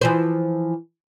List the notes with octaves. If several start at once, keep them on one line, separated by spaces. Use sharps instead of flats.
E3 F3 C5